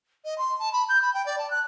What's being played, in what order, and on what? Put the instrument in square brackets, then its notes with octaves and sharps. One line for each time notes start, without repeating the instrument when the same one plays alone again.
[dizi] D#5
C6
A5
B5
G6
B5
G5
D5
A5
F#6